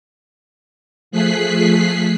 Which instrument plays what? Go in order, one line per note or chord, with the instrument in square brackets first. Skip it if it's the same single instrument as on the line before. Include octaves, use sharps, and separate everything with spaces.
[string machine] F3 A3 G#4 F#6 B6 C7